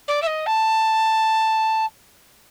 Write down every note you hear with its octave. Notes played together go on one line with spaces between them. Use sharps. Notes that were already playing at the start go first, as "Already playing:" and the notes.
D5
E5
D#5
A5